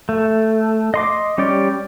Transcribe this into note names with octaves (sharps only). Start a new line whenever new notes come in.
A3
D#5 C6 D6
G3 C#4 G4 D5